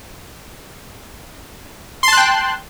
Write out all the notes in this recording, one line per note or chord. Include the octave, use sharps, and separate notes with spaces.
G5 A5 C6 F#6